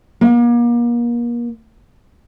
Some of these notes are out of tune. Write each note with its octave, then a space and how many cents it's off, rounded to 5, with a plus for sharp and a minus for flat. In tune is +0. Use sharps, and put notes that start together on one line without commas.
A#3 +35